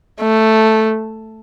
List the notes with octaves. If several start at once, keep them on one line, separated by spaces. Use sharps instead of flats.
A3